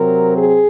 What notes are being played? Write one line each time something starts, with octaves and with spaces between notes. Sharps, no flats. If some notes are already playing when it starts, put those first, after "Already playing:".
Already playing: C3 F#3 C4 A#4
G#4